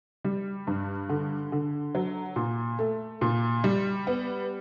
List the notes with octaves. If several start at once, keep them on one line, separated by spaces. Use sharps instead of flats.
G3
G2
D3
D3
F#3
A#2
A3
A#2
G3
B3